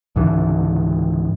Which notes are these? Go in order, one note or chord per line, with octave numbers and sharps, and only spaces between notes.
C#2 G#2 D3 E3